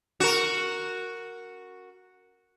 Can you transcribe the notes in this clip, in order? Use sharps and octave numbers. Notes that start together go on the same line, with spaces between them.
F#4 A#4